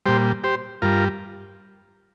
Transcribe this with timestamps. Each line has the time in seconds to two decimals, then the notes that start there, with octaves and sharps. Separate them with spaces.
0.06 A#2 G3 G4 C5
0.44 G4 C5
0.82 G2 G3 F4 A#4